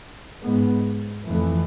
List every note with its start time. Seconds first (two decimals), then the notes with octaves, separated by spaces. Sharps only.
0.42 G#2 G#3 B3
1.26 F2 E3 A3